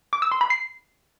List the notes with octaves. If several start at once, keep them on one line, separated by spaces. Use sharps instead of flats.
D6
E6
C6
B5
C7